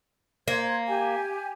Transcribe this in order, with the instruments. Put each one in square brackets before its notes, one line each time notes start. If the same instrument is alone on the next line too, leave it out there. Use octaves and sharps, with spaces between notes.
[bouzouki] A#3 [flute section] C5 G#6
[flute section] G4 G#5